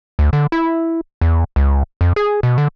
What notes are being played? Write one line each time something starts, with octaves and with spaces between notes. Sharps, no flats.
D2
D3
E4
E2
C#2
F2
G#4
B2
D3